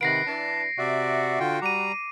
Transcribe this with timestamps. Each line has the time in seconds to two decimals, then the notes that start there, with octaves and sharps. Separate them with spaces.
0.01 C3 D#3 B4 F#5 A#6 C7 D7
0.27 E3 D4 A5
0.78 C3 F#4 D5 E5
1.40 D3 F4 G5
1.62 G3 A#5 D6 D#7